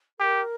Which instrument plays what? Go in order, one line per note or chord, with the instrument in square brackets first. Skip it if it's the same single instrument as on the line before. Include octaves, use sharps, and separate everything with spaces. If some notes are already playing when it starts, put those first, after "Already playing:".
[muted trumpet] G4 [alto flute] A#4